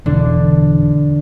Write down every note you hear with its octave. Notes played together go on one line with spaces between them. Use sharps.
E1 D3 D4